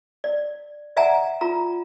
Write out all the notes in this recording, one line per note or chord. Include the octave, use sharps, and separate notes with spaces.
D5
D5 E5 F#5 G#5 A#5
F4 A#5